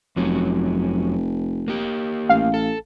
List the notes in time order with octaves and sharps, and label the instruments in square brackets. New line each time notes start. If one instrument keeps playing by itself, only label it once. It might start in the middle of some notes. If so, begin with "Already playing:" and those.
[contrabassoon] F1 [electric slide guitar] F2 F#3 C#4
[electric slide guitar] A#3 G4
[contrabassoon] A1 [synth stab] F5
[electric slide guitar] A4